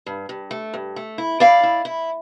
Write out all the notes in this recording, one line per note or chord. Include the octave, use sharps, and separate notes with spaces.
G2
G2
A3
G2
A3
E4
E4 D5 F5
E4
E4